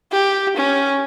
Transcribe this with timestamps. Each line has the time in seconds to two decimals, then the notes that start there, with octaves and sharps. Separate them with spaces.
0.12 G4
0.57 C#4